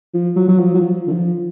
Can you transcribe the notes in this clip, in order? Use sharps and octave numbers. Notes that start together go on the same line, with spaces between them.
F3
F#3
F#3
F3
F#3
F3
D3
F3